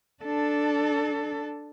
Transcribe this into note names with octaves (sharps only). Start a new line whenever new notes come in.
D4 A4